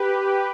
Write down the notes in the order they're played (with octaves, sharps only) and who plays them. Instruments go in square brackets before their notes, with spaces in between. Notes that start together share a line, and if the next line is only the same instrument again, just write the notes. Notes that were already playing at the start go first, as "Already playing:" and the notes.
Already playing: [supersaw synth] G4 B4